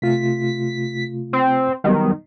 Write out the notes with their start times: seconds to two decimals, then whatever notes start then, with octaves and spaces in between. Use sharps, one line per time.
0.02 C3 A3 F4 B6
1.33 C4
1.84 D#3 F#3 G3 B3